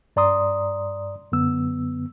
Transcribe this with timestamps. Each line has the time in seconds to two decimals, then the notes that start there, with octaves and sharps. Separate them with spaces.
0.16 G2 D5 A#5 C6 D#6
1.32 F#2 D3 B3 E6